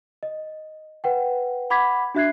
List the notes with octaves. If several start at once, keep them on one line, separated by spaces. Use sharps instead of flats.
D#5
B4 F#5 G5
F#5 B5 D6 G#6 B6
D4 F#4 E5 F#6 G#6 C7